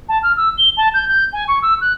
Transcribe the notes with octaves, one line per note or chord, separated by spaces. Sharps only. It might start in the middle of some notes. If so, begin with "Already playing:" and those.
A5
F6
E6
G7
A5
G6
G6
G#5
C#6
E6
F#6